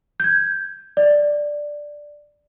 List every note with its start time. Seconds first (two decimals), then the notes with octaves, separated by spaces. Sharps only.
0.20 G6 G#6
0.97 D5